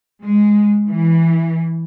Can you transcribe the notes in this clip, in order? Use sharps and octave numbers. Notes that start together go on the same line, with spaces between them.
G#3
E3